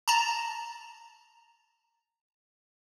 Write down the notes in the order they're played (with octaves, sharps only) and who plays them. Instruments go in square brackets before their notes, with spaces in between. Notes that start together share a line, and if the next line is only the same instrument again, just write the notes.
[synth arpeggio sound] A5 A#5